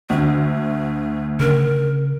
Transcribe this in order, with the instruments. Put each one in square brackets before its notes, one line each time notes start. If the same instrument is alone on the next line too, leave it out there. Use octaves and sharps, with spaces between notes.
[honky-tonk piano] D2 D3 [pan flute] A3
[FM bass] C#3 [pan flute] A#4